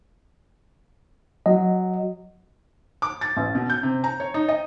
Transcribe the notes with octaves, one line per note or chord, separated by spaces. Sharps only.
F#3 D#5
D6
A6
A1
B2
G6
C3
A#5
C#5
D#4
D#5